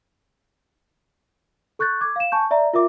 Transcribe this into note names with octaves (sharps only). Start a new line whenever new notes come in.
A4 C#6 F#6 G6 A6
D6 G#6
F5 E7
G#5 A5 C#6 G6
D5 E5 A#5
F4 A#4 E5 D6